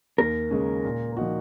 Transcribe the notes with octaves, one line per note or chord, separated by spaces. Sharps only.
D#2 A#4
C#3 G#3 C#4
A#2
F3 A#3 D#4 F#4